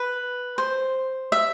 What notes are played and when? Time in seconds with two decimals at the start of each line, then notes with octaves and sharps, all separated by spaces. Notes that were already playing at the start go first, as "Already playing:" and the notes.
Already playing: B4
0.58 C5
1.32 E5